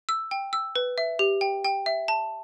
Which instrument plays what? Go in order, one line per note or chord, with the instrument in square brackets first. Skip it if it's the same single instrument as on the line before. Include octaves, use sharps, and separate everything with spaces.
[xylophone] E6
G5
E6
B4
E5
G4
G5
G5
E5
A5